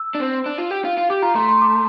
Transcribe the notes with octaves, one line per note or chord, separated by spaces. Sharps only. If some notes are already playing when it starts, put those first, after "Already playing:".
Already playing: E6
D4
C4
D4
F4
G4
F4
F4
G4 D6
F4 A#5
A3 C6
C6
D6